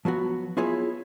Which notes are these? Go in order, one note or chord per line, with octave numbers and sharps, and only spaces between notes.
F3 F#3 B3 F#4
B3 E4 F4 G#4 C#5 E5